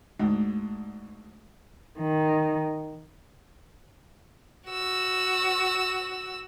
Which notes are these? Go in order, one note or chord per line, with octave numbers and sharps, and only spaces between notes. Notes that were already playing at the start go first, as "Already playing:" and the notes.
D2 G#2
D#3
F#4 E6